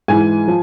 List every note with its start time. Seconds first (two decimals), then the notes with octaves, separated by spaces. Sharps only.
0.08 G#2 E3 G#5
0.48 F3